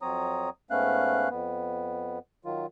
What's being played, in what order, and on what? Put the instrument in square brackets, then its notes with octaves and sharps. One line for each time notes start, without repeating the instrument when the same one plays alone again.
[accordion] F2 F#3 C4 C#5 A#5 D#6
G#2 A3 B3 C#4 F5 F#6
F2 B3
D#3 F#3 F4